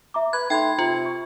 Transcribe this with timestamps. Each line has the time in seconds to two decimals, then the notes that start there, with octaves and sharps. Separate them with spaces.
0.14 E5 A#5 D6
0.33 B4 F#6 G#6
0.50 A3 D#4 G5 B5 C6 G#6
0.79 C3 F4
1.06 C#6